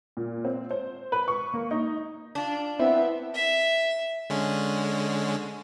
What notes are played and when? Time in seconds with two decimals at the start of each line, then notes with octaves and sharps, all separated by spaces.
0.17 A#2
0.45 C4
0.71 C5
1.12 B4
1.28 C#6
1.54 A#3
1.71 D#4
2.35 D4 F4
2.79 B3 C4 E4 E5
3.34 E5
4.30 D3 G#3 C#4